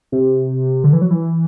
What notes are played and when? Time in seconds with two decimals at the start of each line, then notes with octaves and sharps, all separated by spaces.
0.12 C3
0.84 D3
0.93 E3
1.02 F#3
1.11 E3